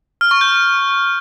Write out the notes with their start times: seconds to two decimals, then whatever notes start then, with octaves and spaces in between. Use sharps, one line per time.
0.21 F6
0.31 C#6
0.41 G6